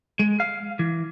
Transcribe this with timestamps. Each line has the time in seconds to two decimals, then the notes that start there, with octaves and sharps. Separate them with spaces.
0.19 G#3
0.40 F5
0.79 E3